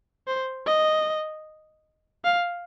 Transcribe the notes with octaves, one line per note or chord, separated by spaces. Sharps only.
C5
D#5
F5